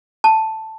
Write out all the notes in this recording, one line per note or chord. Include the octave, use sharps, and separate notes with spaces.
A5